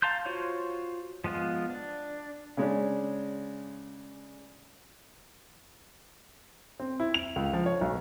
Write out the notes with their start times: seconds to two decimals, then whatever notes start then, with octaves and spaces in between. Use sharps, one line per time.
0.02 F5 A5 A#5 C6 G6
0.26 F4 F#4 C5 C#5
1.24 F3 G#3 B3 F4
1.70 D4
2.57 C#3 G#3 C#4 D4
6.80 C4
7.00 E4
7.14 F7
7.36 C#2
7.53 F3
7.66 C#5
7.81 B1